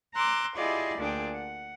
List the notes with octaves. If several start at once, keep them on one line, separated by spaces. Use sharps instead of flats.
A#5 C6 D6 E6 F#6
E4 F4 G4 G#4 D5 D#5
D2 A#2 D4 G#4 G5
F#5